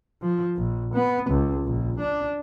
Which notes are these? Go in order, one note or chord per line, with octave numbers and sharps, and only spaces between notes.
F3
A#1
B3
C#2
A#1
D4